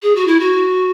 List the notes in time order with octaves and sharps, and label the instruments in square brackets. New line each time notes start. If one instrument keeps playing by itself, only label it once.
[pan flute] G#4
F#4
E4
F#4